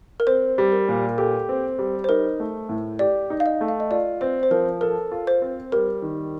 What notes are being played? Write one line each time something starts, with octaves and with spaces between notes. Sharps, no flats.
A#4
C4 C5
G3
A#4
A#2
G4 A4
C4
G3
C5
D#4 A#4
A3
A2
G4 D5
D#4
F5
D#5
A3
F5
D#5
F4 D5
C4 C5
C5
F3 A#4
A4 A#4
F4
C5
C4
G3 A#4
D#3